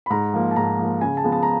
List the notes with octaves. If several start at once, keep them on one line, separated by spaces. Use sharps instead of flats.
B5
G#2 A#5
F3 A#3
A5
G#2 A#5
F3 A#3
C#3 G#5
A5
F3 G#3 B3
A5
A#5